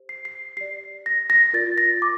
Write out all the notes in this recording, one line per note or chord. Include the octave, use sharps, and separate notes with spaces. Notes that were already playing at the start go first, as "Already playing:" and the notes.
Already playing: G4 C5
C7
C7
G4 D5 C7
A#6
A#6
F4 A#4 D5 A6
A#6
D6